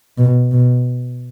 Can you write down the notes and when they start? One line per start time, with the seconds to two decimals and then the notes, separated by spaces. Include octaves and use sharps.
0.18 B2
0.52 B2